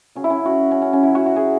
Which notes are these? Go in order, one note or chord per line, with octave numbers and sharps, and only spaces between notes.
C#3 F#3 C#4
E4
C#4
F#4
C#4
C#4
C#4
C#3 F#3 E4
F#4
F#4
G#4